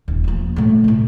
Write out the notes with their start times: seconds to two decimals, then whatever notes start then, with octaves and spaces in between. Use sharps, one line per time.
0.08 D#1
0.24 F3 A#3
0.56 A#2 A3
0.84 A2 C3